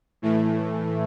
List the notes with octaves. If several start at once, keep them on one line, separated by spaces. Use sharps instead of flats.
A2 E3 A3